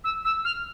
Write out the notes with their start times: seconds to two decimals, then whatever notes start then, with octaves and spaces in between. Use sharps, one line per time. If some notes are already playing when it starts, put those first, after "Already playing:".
0.04 E6
0.25 E6
0.45 F6